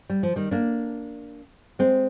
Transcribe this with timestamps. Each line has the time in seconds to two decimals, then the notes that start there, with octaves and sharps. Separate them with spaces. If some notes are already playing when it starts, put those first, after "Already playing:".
0.10 G3
0.23 F3
0.36 D#3 G3
0.51 A#3 D4
1.79 G#3 C4